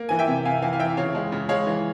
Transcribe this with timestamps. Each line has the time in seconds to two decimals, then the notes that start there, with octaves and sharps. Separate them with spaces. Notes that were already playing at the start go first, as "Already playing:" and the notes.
Already playing: A#3
0.09 E3 G#5
0.19 E5 G5
0.28 C3
0.45 C3 F5 G#5
0.62 E3 F5 G#5
0.73 F5
0.79 E3 E5 G5
0.97 C#3 C#5 F5
1.15 G#3
1.32 C#3
1.49 G#3 C#5 F5
1.67 E3